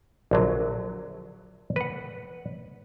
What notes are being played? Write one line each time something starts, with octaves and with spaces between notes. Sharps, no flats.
A#1 D3 F#3
B4 F#5